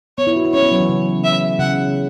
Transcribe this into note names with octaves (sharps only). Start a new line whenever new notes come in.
B3 C#5
E4
F#4
E4
C#4 C#5
B3
F#3
E3
C#3
E5
C#3 F#5